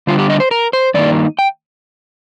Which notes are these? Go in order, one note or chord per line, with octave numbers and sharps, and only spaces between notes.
D3 G3 D4 F4
G4
D#5
C5
A#4
C5
G2 D#3 A#3 D#4 D5
G5